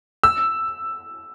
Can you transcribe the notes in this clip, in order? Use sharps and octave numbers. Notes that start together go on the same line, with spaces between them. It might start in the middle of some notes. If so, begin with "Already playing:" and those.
E6